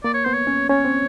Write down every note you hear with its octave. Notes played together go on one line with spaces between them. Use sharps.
A#3 D5
C#5
B3 C5
C#5
C#4
C#4 C#5
C4